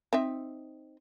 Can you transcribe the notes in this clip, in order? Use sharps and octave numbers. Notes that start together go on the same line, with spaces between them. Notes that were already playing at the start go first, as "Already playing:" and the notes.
C4 D#4 E5